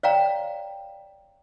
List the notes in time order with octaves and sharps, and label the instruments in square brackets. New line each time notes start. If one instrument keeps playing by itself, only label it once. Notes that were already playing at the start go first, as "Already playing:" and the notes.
[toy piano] C#5 D5 F5 G5 A#5